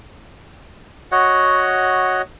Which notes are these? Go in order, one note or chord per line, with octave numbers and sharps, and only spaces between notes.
F#4 C#5 D#5 F#5